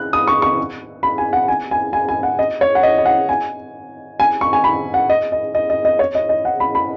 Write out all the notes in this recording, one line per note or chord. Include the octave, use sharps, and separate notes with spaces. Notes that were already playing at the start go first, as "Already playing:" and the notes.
Already playing: F#6
D#6
C#6
C#6
B5
G#5
F#5
G#5
G#5
G#5
G#5
F#5
D#5
C#5
F#5
D#5
D#5
F#5
G#5
G#5
C#6
G#5
B5
F#5
D#5
D#5
D#5
D#5
D#5
C#5
D#5
D#5
F#5
B5
B5